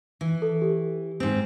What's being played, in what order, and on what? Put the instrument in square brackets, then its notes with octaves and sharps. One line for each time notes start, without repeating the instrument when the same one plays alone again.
[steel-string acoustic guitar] E3
[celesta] A4
G4
[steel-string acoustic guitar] G#2 C4